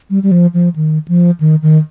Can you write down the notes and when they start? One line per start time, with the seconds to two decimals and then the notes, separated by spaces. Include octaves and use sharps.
0.10 G3
0.23 G3
0.31 F3
0.54 F3
0.76 D#3
1.08 F3
1.40 D#3
1.62 D#3